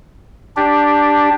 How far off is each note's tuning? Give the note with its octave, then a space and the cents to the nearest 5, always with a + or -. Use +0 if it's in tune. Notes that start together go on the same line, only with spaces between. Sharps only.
D4 +0 G4 +5